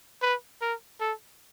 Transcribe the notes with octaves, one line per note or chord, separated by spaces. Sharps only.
B4
A#4
A4